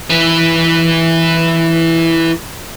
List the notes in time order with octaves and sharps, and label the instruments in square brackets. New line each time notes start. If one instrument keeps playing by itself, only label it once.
[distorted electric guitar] E3 B4